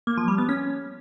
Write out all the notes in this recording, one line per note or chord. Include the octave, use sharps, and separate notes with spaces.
A#3
F3
G3
B3
C#4